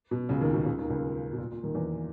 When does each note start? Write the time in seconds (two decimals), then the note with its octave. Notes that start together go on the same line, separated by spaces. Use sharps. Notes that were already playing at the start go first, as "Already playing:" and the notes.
0.11 B2
0.29 C#2 C#3
0.41 D#2 D#3
0.53 B2
0.66 C#2 C#3
0.79 D#2 D#3
0.90 C#2 C#3
1.33 B2
1.38 A#2
1.52 A#2
1.63 D#2 D#3
1.75 E2 E3